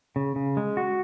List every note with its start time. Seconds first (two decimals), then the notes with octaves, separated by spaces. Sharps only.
0.16 C#3
0.36 C#3
0.57 G#3
0.77 F#4